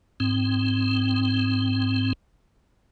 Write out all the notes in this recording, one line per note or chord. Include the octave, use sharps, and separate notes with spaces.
G#2 C4